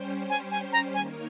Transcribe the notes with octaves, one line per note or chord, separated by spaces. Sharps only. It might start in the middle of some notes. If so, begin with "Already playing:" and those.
Already playing: G3 C#4 G4 C5
G#5
G#5
A#5
D#3 A#3 D#4 A#4 C#5 G#5